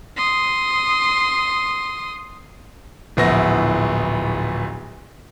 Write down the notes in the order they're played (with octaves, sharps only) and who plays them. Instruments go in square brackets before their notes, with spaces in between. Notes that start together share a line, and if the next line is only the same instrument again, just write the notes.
[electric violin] C6 D#6
[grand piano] D1 A#1 B3 E4 A#6